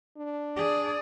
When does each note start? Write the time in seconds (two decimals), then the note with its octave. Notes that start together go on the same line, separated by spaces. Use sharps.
0.17 D4
0.56 G#4 D5